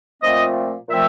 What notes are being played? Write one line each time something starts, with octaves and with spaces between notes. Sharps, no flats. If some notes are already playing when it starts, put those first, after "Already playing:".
A#2 F3 A3 C4 D#5
A#2 F3 A3 C4 E5